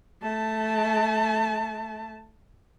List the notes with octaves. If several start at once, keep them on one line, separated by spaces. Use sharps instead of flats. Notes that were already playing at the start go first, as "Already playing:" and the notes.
A3 A5